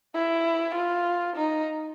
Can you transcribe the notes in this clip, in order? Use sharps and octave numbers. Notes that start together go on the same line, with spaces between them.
E4
F4
D#4